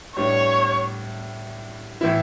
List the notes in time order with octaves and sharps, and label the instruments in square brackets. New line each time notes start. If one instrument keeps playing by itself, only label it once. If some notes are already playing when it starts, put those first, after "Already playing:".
[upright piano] A2 G3 B3 D4 [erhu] C#5
[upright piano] A2 E3 B3 E4